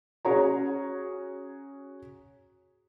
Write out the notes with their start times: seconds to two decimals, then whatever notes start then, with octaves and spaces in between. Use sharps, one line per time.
0.25 C#4 F#4 G#4 C#5 A#5